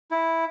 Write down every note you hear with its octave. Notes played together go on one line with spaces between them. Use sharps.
E4